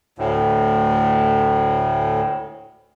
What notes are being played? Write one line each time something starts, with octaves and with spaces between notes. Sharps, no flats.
D2 A2